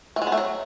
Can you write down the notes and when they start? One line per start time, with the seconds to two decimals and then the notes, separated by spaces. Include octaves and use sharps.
0.16 A3
0.22 G#3
0.27 B3
0.32 A3
0.38 F#3